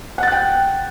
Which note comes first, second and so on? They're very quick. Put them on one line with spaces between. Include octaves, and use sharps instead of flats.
F#5 A6 F#6 G5